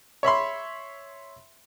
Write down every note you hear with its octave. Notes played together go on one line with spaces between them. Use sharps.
C#5 E5 B5 C6